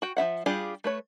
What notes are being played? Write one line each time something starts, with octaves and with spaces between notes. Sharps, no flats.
F#4 G5
F3 F4 E5 F#5
G3 D4 F4 G4 G#4
A3 B4 C#5